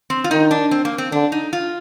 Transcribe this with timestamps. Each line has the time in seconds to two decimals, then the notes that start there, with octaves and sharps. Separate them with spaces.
0.10 C4
0.24 F4
0.31 D#3 D#4
0.51 D4
0.71 C4
0.85 A#3
0.98 C4
1.12 D3 D4
1.32 D#4
1.53 F4